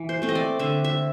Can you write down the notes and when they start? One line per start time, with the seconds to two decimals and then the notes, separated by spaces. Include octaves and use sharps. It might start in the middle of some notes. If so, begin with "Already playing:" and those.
Already playing: E3
0.09 C5
0.22 A3 C4
0.29 D#5
0.35 D5
0.59 D3 E5
0.84 E5